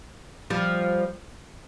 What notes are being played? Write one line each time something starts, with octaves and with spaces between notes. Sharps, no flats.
F3 G3